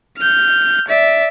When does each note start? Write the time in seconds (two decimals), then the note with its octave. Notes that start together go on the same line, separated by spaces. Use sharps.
0.17 F6 G6
0.88 D5 E5